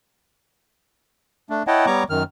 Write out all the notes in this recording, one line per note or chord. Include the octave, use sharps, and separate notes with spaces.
A3 D4
E4 C#5 D#5 F#5 G5 A5
G3 B3 C#5 A#5 C#6 D6
F#2 D#3 F6